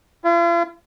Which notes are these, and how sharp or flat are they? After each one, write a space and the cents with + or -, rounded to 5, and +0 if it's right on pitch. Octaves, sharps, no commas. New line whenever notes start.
F4 -45